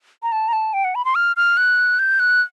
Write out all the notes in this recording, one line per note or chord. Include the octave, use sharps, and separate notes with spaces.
A#5
A5
A#5
A5
G5
F#5
B5
C6
F6
F6
F#6
G6
F#6